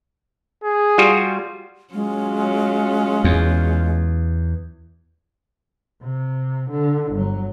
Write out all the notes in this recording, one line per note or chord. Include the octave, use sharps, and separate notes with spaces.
G#4
G3 F4 F#4
F#3 G#3 C#4 F4
E2
C3
D3
G1 F#3